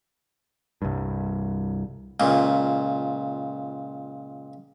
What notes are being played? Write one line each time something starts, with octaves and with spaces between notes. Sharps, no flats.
C2 G2
C#2 A#2